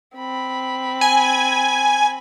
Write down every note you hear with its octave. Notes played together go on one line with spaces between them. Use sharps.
C4 B5
G#5